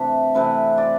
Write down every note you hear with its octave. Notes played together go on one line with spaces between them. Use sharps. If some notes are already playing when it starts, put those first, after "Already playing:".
Already playing: C3 E3 A3 D4 B4
C3 E3 A3 B4
D5